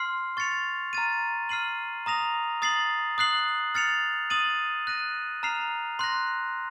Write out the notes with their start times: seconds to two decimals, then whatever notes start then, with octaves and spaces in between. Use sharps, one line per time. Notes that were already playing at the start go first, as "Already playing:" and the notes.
Already playing: C6 F6 C7
0.37 C#6 A6 C#7 F7
0.93 A#5 F6 A6 D#7
1.49 F6 C7 D#7 F#7
2.06 A#5 D#6 A#6 F7
2.62 D#6 A6 C7 F#7
3.18 D#6 F#6 C7 F#7
3.74 F6 A6 C#7 F7
4.30 D#6 A6 D#7 F#7
4.87 F#6 A#6 D#7
5.43 A#5 F6 C7 F7
5.99 C6 F#6 A#6